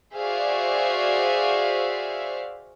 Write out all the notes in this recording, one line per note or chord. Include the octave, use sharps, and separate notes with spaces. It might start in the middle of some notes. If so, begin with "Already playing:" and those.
F#4 G#4 C5 D5 E5 F5